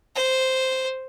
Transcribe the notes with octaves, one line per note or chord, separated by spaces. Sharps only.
C5